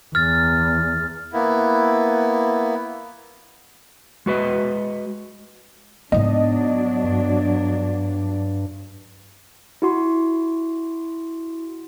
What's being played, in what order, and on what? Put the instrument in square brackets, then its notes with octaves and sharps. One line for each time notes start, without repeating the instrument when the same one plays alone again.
[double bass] E2 [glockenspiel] F6 A6
[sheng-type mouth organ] A#3 B3 E4
[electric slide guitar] G#3 F#4 B4 D#5
[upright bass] G#2 B3 [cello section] F#3 D4 [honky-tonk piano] D#5
[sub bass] G2
[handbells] E4 F#4 C6